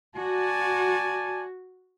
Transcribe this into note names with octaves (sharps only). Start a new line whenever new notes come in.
F#4 D5 G#5 A5